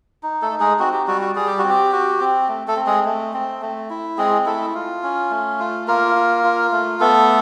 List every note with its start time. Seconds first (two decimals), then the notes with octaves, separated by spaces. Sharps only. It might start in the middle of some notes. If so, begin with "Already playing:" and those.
0.23 D#4
0.42 A3 A4
0.51 D#4
0.60 G#3 G#4
0.79 C4 F#4
0.93 G4
1.07 G3 F#4
1.22 F#4
1.35 G3 G#4
1.47 G4
1.59 F#4
1.64 C4
1.69 G4
1.92 F#4
2.20 C4
2.48 A3
2.68 A3 A4
2.76 C4
2.86 G#3 G#4
3.05 A3
3.34 C4
3.62 A3
3.90 E4
4.18 G#3 C4 G#4
4.46 A3 E4 A4
4.74 F4
5.03 C#4
5.30 A3
5.60 F4
5.87 A#3 F4 A#4
6.16 F4
6.44 F4
6.72 A3
7.00 A3 B3 A4